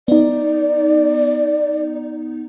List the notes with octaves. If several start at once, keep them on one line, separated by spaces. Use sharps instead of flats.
B3 D#4 D5